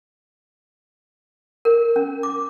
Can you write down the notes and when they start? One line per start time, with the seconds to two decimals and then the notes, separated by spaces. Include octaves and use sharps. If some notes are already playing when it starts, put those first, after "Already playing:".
1.65 A#4
1.96 C#4
2.23 D6